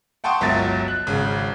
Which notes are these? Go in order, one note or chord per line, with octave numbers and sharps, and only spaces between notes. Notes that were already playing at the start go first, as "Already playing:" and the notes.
F#5 G5 A5 C6 C#6 D#6
G1 C#2 F#3 A#4 E5 A6
F#6
G#1 C#3